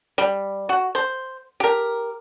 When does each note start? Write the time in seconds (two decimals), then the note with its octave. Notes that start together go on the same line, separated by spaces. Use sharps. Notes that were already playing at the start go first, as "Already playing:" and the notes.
0.18 G3
0.69 F#4
0.95 C5
1.60 G4 A#4